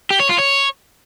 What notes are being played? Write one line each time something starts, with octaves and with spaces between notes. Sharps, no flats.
G4
C#5
F4
C#5